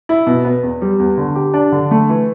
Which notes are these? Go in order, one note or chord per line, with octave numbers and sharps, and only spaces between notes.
E4
B2
B3
E2
G3
E2
D3
G4
D4
D3
A3
E3